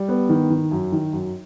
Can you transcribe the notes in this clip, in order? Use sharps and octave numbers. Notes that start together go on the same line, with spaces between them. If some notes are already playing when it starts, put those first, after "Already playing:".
Already playing: G3
B3
D#3
D#3
F#2
D#3
F#2